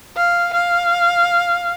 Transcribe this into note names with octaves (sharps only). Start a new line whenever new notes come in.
F5
F5